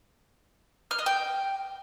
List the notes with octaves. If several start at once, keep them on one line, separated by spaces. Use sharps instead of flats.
F6
D#5
G5